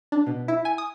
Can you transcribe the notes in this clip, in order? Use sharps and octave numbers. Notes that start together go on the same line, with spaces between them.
D4
B2
E4
G#5
D#6